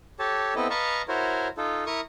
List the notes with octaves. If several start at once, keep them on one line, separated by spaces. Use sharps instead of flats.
G4 A4 C#5 A5
B3 C4 E4 A4 D#5
B4 D#5 F5 A5 A#5 C#6
E4 F#4 A#4 C5 C#5
D#4 F4 A4
E4 A#4 C#6 D#6